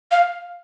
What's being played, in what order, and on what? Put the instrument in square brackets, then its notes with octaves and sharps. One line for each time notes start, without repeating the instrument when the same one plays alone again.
[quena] F5